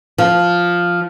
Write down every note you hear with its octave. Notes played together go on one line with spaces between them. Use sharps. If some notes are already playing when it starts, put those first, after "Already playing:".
F3